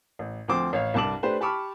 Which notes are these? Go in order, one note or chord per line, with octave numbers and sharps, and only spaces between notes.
A1
D2 F3 C4 C5 D6
A1 C#5 F5
C2 G2 A5 D6 F#7
A3 D4 G4 B4 C5
G4 A5 B5 C#6 D6 F6